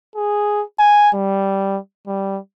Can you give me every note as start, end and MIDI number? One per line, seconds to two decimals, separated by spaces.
0.16 0.63 68
0.79 1.09 80
1.14 1.78 55
2.07 2.39 55